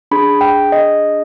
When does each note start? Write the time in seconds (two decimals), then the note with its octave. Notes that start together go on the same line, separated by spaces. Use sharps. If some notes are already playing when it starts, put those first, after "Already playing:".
0.11 D4 G#4 B5
0.41 G5
0.72 D#5